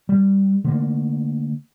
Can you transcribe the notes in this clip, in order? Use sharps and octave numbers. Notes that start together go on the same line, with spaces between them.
G3
D3 A3 A#3